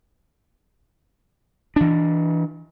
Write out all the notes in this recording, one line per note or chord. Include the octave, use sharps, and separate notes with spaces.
E3 D4